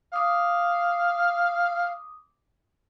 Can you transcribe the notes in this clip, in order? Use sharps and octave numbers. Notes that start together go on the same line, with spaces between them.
F5 D6 D#6